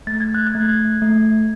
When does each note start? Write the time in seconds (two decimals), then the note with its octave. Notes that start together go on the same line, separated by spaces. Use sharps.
0.07 A3 A6
0.20 G#6
0.34 F#6
0.47 G#6
0.55 A3
1.02 A3